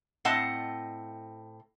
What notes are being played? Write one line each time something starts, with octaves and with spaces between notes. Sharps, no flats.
A2 C4 D#5 F#5 A5